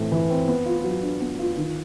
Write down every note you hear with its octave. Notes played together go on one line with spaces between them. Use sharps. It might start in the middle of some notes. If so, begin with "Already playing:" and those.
Already playing: A2 E3 A3 C4
E3
C4
B3
F4
F#3
D4
B3
F4
D#3